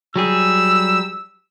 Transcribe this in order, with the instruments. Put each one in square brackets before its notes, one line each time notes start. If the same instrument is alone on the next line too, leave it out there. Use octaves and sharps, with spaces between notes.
[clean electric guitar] F#3 G3 G#4 [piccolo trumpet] E6